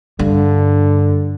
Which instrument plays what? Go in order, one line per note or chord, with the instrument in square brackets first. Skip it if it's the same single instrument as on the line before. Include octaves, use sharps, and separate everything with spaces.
[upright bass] G2 [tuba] D3